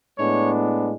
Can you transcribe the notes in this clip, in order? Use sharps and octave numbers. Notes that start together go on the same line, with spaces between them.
A2 G#3 B3 D4 C#5